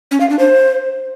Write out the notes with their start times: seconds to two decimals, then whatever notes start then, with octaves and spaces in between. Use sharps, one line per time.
0.11 C#4
0.21 F5
0.30 D4
0.39 C5